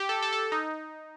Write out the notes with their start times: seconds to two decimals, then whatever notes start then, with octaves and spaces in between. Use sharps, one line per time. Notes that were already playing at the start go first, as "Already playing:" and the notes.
Already playing: G4
0.09 A4
0.23 A4
0.33 A4
0.52 D#4